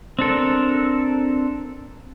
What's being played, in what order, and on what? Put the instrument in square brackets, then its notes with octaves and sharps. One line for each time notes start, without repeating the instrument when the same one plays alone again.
[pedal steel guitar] C4 D4 A4 A#4